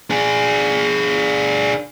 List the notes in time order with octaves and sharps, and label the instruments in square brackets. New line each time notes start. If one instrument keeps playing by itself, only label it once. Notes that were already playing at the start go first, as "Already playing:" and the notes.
[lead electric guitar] D4 G#4